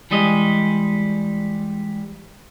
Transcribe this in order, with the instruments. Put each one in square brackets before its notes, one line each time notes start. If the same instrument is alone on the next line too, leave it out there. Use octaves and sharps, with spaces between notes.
[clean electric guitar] E3 G3 G#3 D#5